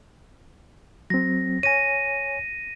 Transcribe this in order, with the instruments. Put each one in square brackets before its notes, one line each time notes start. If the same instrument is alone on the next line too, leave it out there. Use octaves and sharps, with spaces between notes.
[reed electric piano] F#3 C4 [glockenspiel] A#6
[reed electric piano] C#5 G#5 [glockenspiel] A#6 D#7